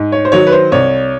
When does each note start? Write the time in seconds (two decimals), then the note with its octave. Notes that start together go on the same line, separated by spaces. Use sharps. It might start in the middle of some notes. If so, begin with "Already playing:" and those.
Already playing: G#2
0.12 C#5
0.25 C5
0.32 D#3 F#3 C#5
0.47 B4
0.52 C5
0.72 C2 C#5